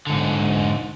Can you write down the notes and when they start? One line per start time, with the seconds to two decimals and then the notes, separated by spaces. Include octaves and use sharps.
0.07 G#2 D3